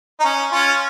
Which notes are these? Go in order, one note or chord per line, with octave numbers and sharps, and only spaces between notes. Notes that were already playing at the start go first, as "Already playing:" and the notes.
D#4
C#4
C#4 F4